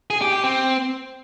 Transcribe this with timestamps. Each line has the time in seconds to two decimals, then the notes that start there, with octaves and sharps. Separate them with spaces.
0.10 G#4
0.21 G4
0.33 G4
0.44 C4